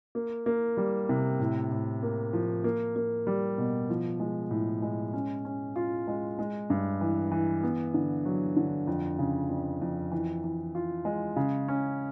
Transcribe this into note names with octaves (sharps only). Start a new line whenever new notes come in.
A#3
A#3
G3
C3
A2
A2
A#3
F3
A#3
A#3
G3
B2
F3
G#3
A2
G#3
C#4
C#4
F4
G#3
G#3
G2
E3
E3
B3
D3
F#3
D3
F2
C#3
F2
F2
E3
E3
F4
G#3
C#3
C#4